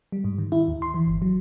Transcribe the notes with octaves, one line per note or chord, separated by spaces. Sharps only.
G3
G#2
D#3
E4
D#2
C6
E3
G1
F#3